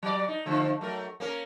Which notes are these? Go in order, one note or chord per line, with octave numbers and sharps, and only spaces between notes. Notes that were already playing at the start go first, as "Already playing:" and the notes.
F#3 D5
D#4
D3 F3 A3
F#3 A3 A#4
A#3 C#4 A#4